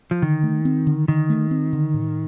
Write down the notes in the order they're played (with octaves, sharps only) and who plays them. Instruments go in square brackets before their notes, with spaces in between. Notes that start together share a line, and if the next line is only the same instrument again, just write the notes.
[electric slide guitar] F3
[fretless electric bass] D3 [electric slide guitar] D#3
[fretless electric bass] A3
C4
D3
[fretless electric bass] D3 [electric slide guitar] D#3
[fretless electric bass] A3
C4
D3
A2